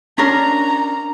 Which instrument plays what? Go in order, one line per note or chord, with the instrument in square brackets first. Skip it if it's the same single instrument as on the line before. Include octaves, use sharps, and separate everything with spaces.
[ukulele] C#4 D4 A#4 [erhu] A#5